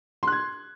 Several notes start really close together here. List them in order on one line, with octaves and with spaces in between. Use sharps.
C6 F#6 G#6